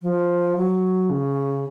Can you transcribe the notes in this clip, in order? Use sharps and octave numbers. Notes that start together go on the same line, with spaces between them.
F3
F#3
C#3